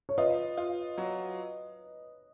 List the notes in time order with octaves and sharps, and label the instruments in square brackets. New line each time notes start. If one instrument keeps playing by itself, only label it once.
[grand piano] C#5
[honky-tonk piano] F4 [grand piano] B4 D#5
[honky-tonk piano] F4
F#3